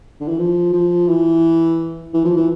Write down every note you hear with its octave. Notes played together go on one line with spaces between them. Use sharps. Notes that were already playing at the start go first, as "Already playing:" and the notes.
D3
E3
F3
F3
E3
E3
F3
E3